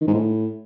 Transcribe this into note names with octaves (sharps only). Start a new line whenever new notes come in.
D#3
G#2
A2